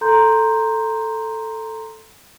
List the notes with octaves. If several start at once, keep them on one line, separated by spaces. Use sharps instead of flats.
A4 A#5 C6 G6